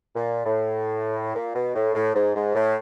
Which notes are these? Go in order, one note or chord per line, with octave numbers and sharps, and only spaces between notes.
A#2
A2
A#2
B2
A2
A2
G#2
G#2
A2